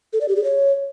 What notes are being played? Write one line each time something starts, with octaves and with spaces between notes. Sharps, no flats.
A4
D5
G4
G#4
C#5